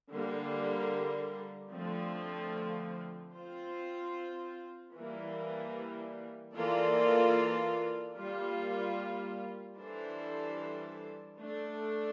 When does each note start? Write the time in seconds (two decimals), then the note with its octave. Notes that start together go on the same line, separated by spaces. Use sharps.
0.10 D3 G3 A#3
1.72 D3 F3 A3 C4
3.32 C4 F4 C5
4.94 E3 G3 A#3
6.55 E3 A#3 F4 A4 D5
8.16 G3 A#3 F4
9.77 E3 G3 D4 A4 C5
11.38 A3 D4 A4